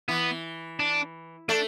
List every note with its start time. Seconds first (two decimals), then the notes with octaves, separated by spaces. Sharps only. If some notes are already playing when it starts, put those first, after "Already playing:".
0.09 E3 B3
0.79 D4
1.49 A3 D4